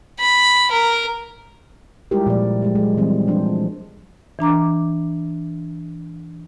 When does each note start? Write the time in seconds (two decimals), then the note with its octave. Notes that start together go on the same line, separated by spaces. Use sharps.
0.20 B5
0.71 A#4
2.11 G3 G#3 E4 F4 G4 A#4
2.26 A#2 F3 G4 D5
2.62 F#3 G#3 G4
2.75 G#3
2.97 E3 G3 C4
3.27 F3 D4 C5
4.39 E3 D4 A#5 D6